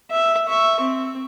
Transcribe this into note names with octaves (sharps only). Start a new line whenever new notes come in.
E5
E5 C#6
C4